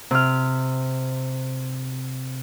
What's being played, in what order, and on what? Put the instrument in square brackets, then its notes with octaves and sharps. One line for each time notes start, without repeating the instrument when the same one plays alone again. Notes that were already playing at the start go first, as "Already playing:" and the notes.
[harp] C3 F6